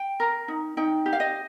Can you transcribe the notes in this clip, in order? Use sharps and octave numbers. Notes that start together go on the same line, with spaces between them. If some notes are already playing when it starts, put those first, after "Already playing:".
Already playing: G5
A#4
D#4
D#4 G5
G4
F5
D#5